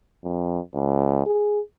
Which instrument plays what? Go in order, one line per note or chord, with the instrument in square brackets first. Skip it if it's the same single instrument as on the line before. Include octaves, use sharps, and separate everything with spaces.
[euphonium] F2
C#2
G#4